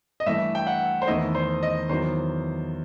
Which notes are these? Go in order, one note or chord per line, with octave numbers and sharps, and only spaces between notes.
D#5
G2 E3 A3 E5
G5
F#5
C5
E2 D#3 A3 E4 D#5
C5
D#5
E2 D#3 F#3 C5